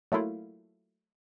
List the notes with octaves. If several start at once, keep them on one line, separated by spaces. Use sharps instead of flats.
F#3 A3 A#3 E4 F4